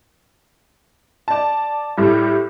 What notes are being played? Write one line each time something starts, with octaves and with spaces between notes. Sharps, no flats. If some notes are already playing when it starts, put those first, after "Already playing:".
D5 A5
A2 G3